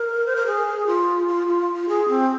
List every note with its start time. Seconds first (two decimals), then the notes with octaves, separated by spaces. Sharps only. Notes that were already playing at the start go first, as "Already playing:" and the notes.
Already playing: A#4
0.26 C5
0.36 A#4
0.47 G#4
0.87 F4
1.28 F4
1.47 F4
1.76 F4
1.89 G#4
2.09 C4